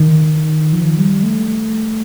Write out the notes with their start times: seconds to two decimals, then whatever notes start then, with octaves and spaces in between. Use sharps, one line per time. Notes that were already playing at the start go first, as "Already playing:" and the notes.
Already playing: D#3
0.73 F3
0.98 G3
1.23 A3